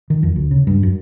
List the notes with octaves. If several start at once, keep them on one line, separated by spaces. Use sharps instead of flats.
D#3
F2
D2
C#3
G2
F#2